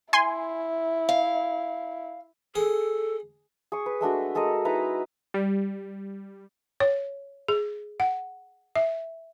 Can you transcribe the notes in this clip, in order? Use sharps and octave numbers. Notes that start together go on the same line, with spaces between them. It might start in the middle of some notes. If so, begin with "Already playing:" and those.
E4 G#5 C6
F5
G#4 A4
G#4 C#6
B4
G#3 A3 D4 F#4
G#3 A4 A#4 D#5
D#4 E4 B4 A#5
G3
C#5
G#4
F#5
E5